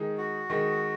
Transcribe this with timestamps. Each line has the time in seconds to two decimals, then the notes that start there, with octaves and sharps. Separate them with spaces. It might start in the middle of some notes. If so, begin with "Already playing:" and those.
Already playing: D#3 G#3 D#4 G#4
0.18 F#4
0.49 D#3 G#3 D#4 G#4